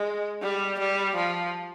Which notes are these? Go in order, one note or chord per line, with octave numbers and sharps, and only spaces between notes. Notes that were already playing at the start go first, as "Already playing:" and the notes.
Already playing: G#3
G3
G3
F3